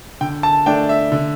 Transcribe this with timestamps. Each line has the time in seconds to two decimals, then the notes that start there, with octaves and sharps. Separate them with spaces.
0.21 D3 G5
0.43 A5
0.66 A3 D4 G5
0.89 E5
1.12 D3